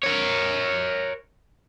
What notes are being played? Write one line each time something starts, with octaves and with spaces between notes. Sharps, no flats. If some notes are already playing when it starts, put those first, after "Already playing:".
A#4 C#5